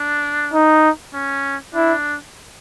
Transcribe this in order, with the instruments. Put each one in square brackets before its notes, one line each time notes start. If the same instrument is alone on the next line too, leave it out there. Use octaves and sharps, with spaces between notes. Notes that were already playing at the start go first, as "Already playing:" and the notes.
Already playing: [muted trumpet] D4
[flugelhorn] D#4
[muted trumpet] C#4
[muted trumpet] D4 [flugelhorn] E4